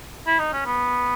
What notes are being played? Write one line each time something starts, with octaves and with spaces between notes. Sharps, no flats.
E4
D#4
C#4
B3